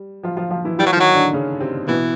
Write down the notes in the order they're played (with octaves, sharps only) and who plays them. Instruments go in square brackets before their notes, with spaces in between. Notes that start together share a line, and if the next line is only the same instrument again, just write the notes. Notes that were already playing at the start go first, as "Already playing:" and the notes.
Already playing: [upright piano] G3
F3 F4
F3 F4
F3 F4
E3 E4
[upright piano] E3 E4 [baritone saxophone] G3
[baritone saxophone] F#3
F3
[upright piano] D#3 D#4
[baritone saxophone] F#3
[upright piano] D3 D4
C#3 C#4
C3 C4
[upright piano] B2 B3 [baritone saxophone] E3